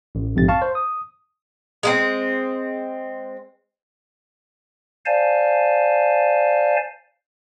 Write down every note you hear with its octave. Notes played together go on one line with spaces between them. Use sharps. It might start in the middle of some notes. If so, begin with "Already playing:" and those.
A1
A#1 F2 G#2 C3 A6
F5 A5 C#6
C5
D#6
G#3 B3 C4
C5 D5 F5 G#5 A5